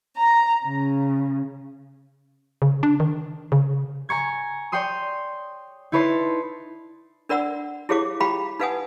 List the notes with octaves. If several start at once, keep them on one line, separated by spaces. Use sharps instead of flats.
A#5
C#3
C#3
D4
D#3
C#3
G#5 A#5 C#6 G#6
C#5 D5 G5 C6 D#6
D#4 E4 B4 C#5 A5 C6
D4 A#4 D5 F#5 E6
E4 G4 G#4 C#5 F5 D6
F4 G4 F5 G5 A#5 B5
D#4 B4 F5 F#5 G#5 D#6